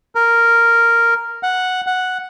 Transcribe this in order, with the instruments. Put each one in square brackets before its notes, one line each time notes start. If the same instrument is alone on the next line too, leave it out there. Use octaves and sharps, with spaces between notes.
[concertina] A#4
F#5
F#5